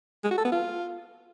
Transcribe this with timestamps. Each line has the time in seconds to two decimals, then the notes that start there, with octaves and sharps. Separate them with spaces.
0.24 G#3
0.31 F#4
0.38 A4
0.45 B3
0.52 F4